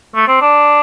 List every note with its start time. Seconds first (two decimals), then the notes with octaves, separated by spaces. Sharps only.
0.15 A3
0.28 C4
0.41 D4